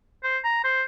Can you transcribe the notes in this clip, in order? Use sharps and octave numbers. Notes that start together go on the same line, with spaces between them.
C5
A#5
C5